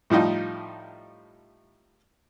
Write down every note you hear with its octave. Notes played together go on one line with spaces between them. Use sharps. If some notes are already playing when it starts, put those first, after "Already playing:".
A2 F3 G3 D#4 F4